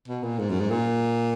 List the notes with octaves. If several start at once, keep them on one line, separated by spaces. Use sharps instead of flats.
B2
A#2
G#2
F#2
G#2
A#2